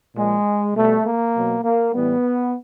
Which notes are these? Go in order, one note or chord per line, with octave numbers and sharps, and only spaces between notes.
A#2 F3 G#3
B2 G3 A3
A#3
B2 F#3
A#3
A2 E3 G3 B3